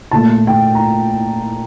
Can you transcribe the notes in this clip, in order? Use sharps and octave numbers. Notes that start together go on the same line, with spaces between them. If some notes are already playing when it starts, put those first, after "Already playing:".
A#2 A3 A5
G5
A#5